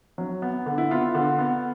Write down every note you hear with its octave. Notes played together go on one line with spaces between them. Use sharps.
F#3
B3
D3
E4
B3 F4
D3
B3